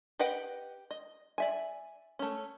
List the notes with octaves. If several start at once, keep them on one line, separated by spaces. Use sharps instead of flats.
G4 B4 D#5 F#5 G5
D#5
D5 E5 G#5
A3 C#4